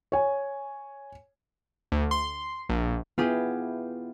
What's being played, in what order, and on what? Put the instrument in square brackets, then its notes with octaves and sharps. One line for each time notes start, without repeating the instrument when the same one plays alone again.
[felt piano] C#5 G#5
[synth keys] D2
C6
A#1
[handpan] B3 E4 [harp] F4 G4 G#4